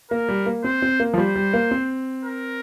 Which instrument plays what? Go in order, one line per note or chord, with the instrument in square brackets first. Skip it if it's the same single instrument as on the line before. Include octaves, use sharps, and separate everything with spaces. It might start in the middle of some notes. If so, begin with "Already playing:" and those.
[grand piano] A#3 [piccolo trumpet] A#4
[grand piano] G3
A#3
[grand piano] C4 [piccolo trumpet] C5
[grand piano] C4
A#3
F3
[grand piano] G3 [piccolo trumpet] C5
[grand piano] G3
A#3
C4
[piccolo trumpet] A#4